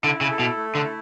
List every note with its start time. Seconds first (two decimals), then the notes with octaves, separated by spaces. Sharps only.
0.04 D3 E4
0.21 C#3
0.31 A4
0.39 B2
0.57 A3
0.75 D3
0.84 E4